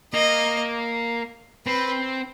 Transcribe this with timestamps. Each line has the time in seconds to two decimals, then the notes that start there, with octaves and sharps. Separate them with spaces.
0.13 A#3 D#5
1.66 C4 B4